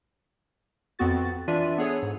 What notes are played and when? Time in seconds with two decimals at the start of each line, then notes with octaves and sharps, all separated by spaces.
0.99 F2 B3 C4 F#4 A6
1.48 E3 D4 F4 D5 E5 D#7
1.78 B3 D4 G#4 A4 C#5
2.02 G#2